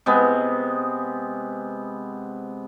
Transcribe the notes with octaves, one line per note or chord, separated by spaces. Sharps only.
C3 G#3 B3